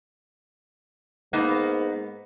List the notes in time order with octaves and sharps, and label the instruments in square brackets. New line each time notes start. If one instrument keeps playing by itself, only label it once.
[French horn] G#2 [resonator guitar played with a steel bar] A#3 B3 D#4